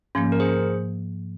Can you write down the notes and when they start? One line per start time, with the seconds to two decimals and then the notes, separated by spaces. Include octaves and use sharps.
0.15 G#2 F3 A#3 C#4
0.32 A#4
0.40 G#4 C5